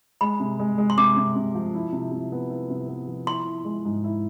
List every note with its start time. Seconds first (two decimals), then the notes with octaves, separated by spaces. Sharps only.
0.21 G#3 B5
0.40 C3
0.59 G#3
0.78 G#3
0.90 C6
0.98 C3 D6
1.17 C3
1.36 C3
1.55 F3
1.75 E4
1.93 C3
2.12 C3
2.32 B3
2.50 E4
2.70 C3
2.88 B3
3.07 F3
3.26 E4 C6
3.46 E4
3.65 G#3
3.85 G#2
4.04 E4